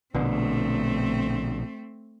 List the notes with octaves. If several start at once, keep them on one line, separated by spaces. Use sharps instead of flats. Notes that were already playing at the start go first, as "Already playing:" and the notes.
A#1 B2 D3 A3 C4